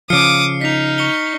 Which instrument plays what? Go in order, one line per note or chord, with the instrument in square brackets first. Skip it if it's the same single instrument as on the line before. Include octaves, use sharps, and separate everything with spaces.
[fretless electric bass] C#3 F3 [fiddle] D6 D#6 [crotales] F6 C7 C#7
[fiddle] D#4 [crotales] B6 F7
[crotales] C#6 C#7 G7